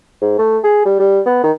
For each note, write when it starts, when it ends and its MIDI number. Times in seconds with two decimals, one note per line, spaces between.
0.21 0.34 44
0.38 0.58 57
0.64 0.85 68
0.85 0.97 55
1.00 1.20 55
1.26 1.39 59
1.43 1.51 51